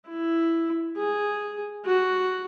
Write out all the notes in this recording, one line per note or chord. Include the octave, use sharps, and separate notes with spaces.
E4
G#4
F#4